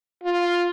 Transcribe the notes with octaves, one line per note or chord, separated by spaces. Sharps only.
F4